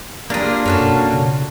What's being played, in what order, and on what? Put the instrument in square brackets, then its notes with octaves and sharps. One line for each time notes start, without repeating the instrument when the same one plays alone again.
[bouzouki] G3 G#4 [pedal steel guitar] A#3 D4 F4
[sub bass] F#2 [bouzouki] C#4 F#4 A4
[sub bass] B2
C#3